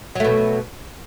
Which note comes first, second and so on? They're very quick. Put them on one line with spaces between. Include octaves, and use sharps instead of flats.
F#3 A3 B2